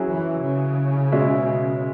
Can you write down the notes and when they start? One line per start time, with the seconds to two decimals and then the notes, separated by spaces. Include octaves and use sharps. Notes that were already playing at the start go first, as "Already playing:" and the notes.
Already playing: F#3 C#4 E4 G#4
0.08 E3
0.42 C#3
1.12 B2 G#3 C#4 F#4 E5